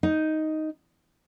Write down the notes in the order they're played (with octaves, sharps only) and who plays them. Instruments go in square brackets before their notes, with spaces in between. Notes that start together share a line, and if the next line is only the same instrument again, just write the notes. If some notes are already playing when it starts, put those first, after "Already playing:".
[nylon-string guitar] D#4